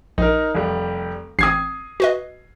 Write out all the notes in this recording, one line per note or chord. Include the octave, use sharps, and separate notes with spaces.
A#1 D#4 A#4
F1 G3
A1 C4 D#6 G#6 C7
F#4 B4 D#5